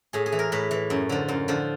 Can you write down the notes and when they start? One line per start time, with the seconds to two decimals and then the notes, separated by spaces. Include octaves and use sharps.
0.13 A2 G#4
0.26 G#4
0.32 E3
0.39 A#4
0.52 A2 B4
0.71 E3
0.90 F#2
1.09 D3 F3
1.28 F#2
1.48 D3 F3